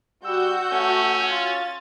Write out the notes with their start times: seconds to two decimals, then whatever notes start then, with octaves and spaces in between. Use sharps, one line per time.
0.24 G3 F#4 E6 G6
0.72 A3 C#4
1.30 F4 A6